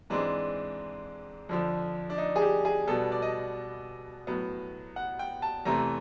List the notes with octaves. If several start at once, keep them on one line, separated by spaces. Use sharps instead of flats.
G#2 E3 G#3 C4 D4
F2 D3 F3
D4
D#4
G#4
G4
G#4
B2 G3 B3 A4
D5
D#5
A2 F#3 B3
F#5
G5
A5
E2 C3 E3 A3 C4 A#5